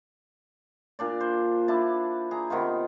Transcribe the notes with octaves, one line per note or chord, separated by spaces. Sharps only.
A#2 D4 D5
C5
D4 E4 A5
G#4 A#5
C3 D#3 B3 F4